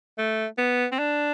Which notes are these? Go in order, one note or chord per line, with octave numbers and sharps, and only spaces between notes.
A3
B3
C4
D4